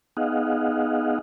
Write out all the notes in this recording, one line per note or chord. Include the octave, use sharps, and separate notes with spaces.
B3 D#4 G#4 D#5 F5 F#5